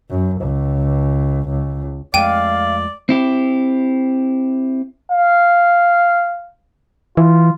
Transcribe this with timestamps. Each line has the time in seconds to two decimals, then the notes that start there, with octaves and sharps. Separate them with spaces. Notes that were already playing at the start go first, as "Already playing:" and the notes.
0.10 F#2
0.41 C#2
1.49 C#2
2.14 F2 G#3 A3 D5 F5 G5 D#7
3.09 C4 E4 G4
5.12 F5
7.17 E3 F4